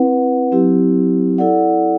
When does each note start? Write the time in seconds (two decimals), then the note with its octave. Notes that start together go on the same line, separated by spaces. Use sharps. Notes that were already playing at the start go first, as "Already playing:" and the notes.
Already playing: C4 E4 B4 F#5
0.51 F#3 C4 E4 G4
1.38 E4 A4 D5 F#5